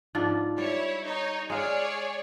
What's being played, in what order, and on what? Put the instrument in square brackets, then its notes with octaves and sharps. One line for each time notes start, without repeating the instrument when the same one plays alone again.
[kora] G#2 F3 D4
[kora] G3 [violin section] E4 C#5
[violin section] D#4 C#5
[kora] G#3 F5 [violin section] G#4 C#5 D5